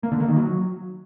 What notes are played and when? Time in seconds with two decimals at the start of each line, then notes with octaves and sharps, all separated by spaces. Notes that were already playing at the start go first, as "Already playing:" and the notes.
0.03 A#3
0.12 D3
0.20 A#3
0.28 D#3
0.37 F#3